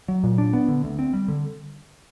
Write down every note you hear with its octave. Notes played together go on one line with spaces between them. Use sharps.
F#3
A#2
D4
B3
D3
D2
C4
G3
D3